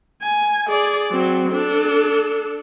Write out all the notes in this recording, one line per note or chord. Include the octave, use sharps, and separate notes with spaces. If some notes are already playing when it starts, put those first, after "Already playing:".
G#5
G#4 D5
F#3 C4
D4 A4